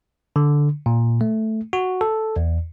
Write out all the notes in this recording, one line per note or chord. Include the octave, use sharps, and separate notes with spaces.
D3
A#2
A3
F#4
A4
E2